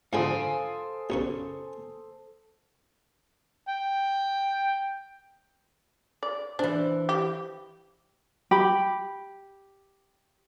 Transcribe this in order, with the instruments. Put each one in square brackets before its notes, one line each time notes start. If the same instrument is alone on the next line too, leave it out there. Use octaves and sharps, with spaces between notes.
[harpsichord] G#2 D3 F3 [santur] A4 C5 D#6 [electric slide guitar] F5 G#5
[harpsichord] B1 F#2 C#3
[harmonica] G5
[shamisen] D5
[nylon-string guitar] E3 C5 [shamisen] D4
[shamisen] G4
[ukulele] G4 B5